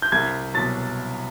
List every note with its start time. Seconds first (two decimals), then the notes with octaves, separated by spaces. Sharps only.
0.02 G6
0.12 C2 G#6
0.54 B2 F#3 A6